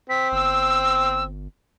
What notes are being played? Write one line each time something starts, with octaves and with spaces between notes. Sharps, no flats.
C4 B6
G1 E6